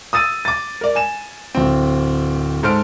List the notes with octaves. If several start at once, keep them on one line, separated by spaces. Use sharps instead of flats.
D#6 E6 A6 D#7
D6 A6
A#4 D5
G#5 E7
D1 C4
G#2 A4 C5 F6 D7